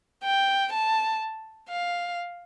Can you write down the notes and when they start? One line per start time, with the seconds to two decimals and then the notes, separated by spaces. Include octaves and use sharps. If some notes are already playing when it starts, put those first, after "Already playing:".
0.24 G5
0.73 A5
1.69 F5